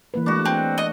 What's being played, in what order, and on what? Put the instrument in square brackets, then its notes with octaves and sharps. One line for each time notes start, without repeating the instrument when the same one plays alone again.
[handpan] E3 A#3 B4
[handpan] G#3 A3 [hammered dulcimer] D4 F#4
[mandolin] C4
D#5